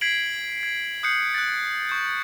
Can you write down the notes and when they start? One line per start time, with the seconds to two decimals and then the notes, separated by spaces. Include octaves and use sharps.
0.01 G#6 B6 C7 D7 F#7
0.63 G#6
1.03 D#6 F#6 G6 C7 C#7
1.34 F#6 A6
1.89 C#6 G6